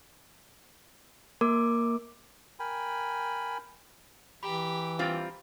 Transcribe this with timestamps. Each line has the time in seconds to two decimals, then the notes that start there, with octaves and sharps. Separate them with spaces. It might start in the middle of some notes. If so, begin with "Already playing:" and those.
1.41 A#3 A#4 D6
2.59 A#4 G5 G#5 B5
4.43 E3 G4 A#5 B5
4.99 G3 C4 F4